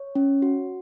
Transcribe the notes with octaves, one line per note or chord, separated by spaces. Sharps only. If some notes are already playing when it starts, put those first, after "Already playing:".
Already playing: C#5
C#4
F#4